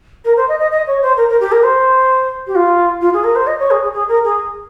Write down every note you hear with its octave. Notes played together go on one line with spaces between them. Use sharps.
A#4
C5
D#5
D#5
D#5
C#5
C5
A#4
A#4
G4
A#4
C5
G4
F4
F4
G#4
A#4
C5
D#5
C#5
G#4
G#4
G#4
A#4
G#4